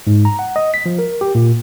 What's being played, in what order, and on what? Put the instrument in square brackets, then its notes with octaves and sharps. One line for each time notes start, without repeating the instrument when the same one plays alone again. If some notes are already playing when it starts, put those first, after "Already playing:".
[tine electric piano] G#2
A#5
F#5
D#5
B6
F3
A#4
G4
A#2